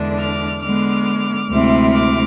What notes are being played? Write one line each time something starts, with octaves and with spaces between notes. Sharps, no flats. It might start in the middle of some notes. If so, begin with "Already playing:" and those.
Already playing: E2 D3 G#3 D4
D6 F6
D3 G#3 B3 D6 F6
D2 C3 G#3 C4 E4
D6 F6